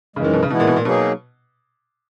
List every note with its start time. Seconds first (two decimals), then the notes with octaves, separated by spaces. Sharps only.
0.16 F#2 C#3 E3 G#3
0.24 D#3
0.33 B2
0.43 C#3
0.50 B2 E3 G#3 B3 E4
0.60 A#2
0.67 B2
0.76 A#2
0.85 B2 F#3 A#3 D#4 G#4